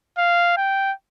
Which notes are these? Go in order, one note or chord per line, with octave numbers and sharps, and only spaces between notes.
F5
G5